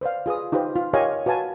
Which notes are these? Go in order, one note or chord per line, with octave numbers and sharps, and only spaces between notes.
B4 C5 D5 F5
F4 G#4 B4 D#6
D#4 F4 G4 B4 C5
F4
G4 A#4 C#5 D#5 F5 G#5
F#4 B4 F5 G#5 A5